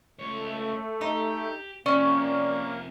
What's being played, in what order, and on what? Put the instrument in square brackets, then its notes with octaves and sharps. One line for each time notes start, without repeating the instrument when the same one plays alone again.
[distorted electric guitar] C#2 C#5 [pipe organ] A3
[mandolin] D#4 [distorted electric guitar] G4
[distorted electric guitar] C3 F3 [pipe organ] A#3 [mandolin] C#4 [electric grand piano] D5